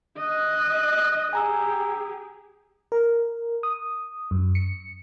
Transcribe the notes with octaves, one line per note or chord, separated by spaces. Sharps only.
D#5 F#6
G4 G#4 G#5 A#5 E6
A#4
D#6
F#2
C#7